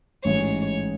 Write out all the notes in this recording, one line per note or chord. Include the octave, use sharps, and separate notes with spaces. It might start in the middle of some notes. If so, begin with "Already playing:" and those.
A1 G#2 E3 G#3 C#4 C#5